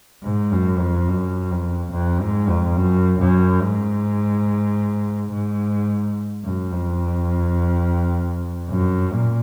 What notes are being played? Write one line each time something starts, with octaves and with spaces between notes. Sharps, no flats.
G#2
F#2
F2
F#2
F2
F2
G#2
F2
F#2
F#2
G#2
G#2
F#2
F2
F#2
A#2